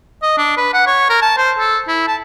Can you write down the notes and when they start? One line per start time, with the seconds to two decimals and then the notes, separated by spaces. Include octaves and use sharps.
0.23 D#5
0.38 D4
0.57 B4
0.74 F#5
0.87 C#5
1.10 A#4
1.22 A5
1.37 C5
1.59 A4
1.88 E4
2.08 A5